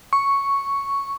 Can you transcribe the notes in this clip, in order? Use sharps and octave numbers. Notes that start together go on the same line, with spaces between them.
C#6